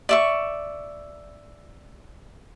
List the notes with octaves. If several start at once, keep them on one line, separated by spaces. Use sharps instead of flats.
D5 E5 C#6